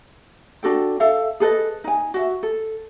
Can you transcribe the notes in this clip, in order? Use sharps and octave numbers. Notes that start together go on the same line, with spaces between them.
D4 F#4 A4 G5
A4 E5 F5
G#4 A4 B4 D#5
D#4 G#5
F#4 E5
A4